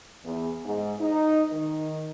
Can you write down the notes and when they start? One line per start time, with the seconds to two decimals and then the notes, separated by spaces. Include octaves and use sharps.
0.24 E2
0.65 G#2
1.00 D#4
1.50 D#3